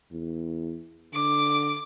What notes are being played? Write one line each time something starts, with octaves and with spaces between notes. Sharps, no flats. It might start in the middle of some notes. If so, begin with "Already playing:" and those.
E2
D3 D6